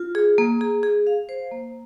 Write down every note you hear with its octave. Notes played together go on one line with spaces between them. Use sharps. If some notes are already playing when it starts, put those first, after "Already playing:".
Already playing: F4
G#4
A#3
G#4
G#4
F5
C5
A#3